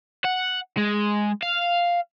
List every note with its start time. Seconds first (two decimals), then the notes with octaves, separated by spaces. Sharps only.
0.24 F#5
0.77 G#3
1.43 F5